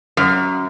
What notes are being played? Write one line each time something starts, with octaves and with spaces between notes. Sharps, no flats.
F#2